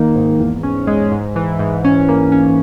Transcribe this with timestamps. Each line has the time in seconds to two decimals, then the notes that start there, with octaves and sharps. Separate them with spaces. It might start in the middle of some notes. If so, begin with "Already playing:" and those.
Already playing: D#3 A#3 D#4
0.16 G#2
0.40 E2
0.63 C#4
0.87 G#3
1.12 G#2
1.36 E3
1.59 G#2
1.85 C#4
2.09 A#3
2.32 C#4